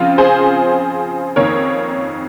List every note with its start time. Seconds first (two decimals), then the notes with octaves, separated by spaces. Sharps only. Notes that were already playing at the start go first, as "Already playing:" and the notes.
Already playing: C#3 F3 C4 F4
0.18 G#4 C5
1.36 F2 D#3 A#3 A#4 C#5